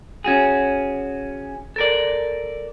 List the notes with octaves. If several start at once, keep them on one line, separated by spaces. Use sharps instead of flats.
C#4 F#4 G#4
A4 A#4 D5